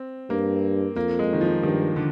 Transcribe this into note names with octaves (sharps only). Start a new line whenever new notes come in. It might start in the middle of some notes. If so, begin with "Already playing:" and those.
Already playing: C4
G2 A#3
F2 A#3
G#3
D#3
F3
G2 D#3
D3